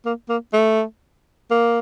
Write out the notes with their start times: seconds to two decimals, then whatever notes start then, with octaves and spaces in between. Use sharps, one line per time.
0.05 A#3
0.29 A#3
0.53 A3
1.51 A#3